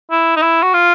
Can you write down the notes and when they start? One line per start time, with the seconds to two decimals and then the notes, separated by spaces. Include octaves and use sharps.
0.11 E4
0.36 D#4
0.42 E4
0.63 F#4
0.74 F4